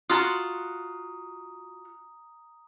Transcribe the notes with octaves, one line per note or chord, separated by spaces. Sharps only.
F4 F#4 A#5 D#6